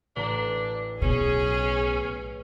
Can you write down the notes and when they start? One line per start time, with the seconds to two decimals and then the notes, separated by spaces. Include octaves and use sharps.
0.16 A1 D4 A#5
1.02 B1 B2 C#4 G#4